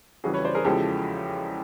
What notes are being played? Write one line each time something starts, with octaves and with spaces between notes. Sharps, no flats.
F2 C#3 E3 G3 F#4 G#4
B4 C#5
C5 D5
G#4 A#4
E2 C#3 F3 G#3 G4 A4